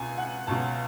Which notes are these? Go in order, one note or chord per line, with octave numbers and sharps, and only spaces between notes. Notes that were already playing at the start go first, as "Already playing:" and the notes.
Already playing: C#2 B2 G#5
F#5
C#2 B2 F#3 A5